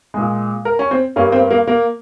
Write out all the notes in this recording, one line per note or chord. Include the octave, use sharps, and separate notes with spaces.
A#2 G#3
A#4
C#4
C4
G2 G3 A#3 C#4
C4
A#3
A#3